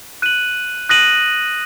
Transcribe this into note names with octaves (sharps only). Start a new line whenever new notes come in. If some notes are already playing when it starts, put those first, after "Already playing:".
F#6 D#7 F#7
D#6 F#6 A#6 D#7 F#7